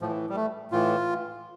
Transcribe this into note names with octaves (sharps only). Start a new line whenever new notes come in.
A2 E3 F3
G3
A3
A2 E3 F4